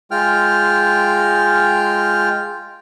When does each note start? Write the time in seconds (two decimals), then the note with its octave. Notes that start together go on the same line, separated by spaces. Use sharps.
0.11 G#3 F4 G5 F6